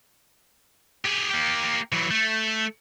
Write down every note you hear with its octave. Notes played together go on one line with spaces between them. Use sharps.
G4 G#4
A#3 G4
E3 F#3
A3